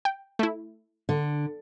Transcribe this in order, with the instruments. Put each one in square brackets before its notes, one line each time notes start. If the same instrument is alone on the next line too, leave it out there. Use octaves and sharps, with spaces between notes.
[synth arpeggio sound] G5
A3 E4
[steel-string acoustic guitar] D3